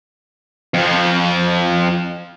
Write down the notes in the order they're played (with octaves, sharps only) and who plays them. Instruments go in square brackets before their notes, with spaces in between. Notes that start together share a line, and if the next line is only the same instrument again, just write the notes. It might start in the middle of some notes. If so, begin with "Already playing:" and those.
[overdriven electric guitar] F2 F3